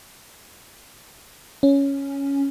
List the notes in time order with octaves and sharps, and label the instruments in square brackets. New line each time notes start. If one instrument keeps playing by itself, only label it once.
[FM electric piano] C#4